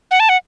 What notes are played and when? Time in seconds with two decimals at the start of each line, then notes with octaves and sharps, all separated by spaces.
0.11 F#5
0.20 A5
0.29 F#5